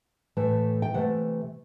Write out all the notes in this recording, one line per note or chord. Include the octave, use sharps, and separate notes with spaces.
A2 E3 A3
G5
C3 E3 A3 F#5